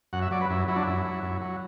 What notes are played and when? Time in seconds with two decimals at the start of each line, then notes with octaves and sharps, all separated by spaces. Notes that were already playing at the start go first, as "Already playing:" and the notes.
0.13 F#2 F#5
0.22 E5
0.31 F#3 D5
0.41 B4
0.50 F#2 E4
0.68 F#3 E4
0.76 D4
0.83 F#2 E4
1.05 F#3
1.23 F#2
1.42 F#3